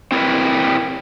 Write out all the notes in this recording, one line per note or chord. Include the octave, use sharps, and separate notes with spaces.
C4 E4 G#4 A#4 B4